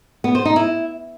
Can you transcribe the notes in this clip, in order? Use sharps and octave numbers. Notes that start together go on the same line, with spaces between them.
B3
C5
D#4
E4